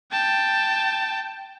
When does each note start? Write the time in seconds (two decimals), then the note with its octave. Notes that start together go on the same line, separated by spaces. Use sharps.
0.12 G5 A5